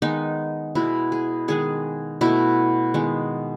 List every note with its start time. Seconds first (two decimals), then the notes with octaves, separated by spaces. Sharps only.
0.02 D#3 G#3 B3 D#4
0.75 B2 G#3 B3 E4
1.12 G#4
1.48 D#3 G#3 B3 G#4
2.21 B2 A3 E4
2.94 D#3 G#3 B3